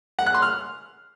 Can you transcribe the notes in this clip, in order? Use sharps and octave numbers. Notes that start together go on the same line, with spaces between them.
F#5
F#6
C6
F6